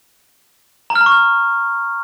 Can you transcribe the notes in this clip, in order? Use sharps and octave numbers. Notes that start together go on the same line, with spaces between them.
A#5
F6
A#5
C#6
F6